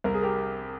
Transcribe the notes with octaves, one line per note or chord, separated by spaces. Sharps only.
C2 A#4
G#4
G4 A#4